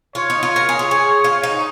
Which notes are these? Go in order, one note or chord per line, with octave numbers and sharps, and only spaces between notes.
F4 C#5
D#4
F4
A#4
G#4
F4
G#4
F4
D#4